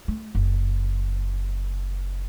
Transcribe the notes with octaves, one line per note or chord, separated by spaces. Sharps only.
A3
F#1